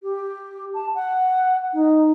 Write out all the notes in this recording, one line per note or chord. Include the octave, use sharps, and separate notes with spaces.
G4
A5
F#5
D#4